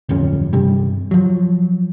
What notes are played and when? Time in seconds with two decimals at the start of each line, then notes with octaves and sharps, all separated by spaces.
0.09 D1 G1 F2 C#4
0.53 G2 C3 G3
1.11 F3 F#3